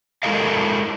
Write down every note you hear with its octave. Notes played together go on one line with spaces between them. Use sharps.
G#3 E4 A4 A#4 D#5 F5